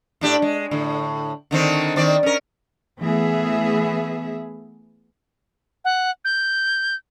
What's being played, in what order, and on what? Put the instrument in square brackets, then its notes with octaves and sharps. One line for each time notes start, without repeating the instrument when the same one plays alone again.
[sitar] A2 D4 G4
G#3
A2 D3
D3 D#3 C4
D#3 C4 D5
C#4 A#4
[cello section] E3 A3 B3 G#4 E5
[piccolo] F#5
G6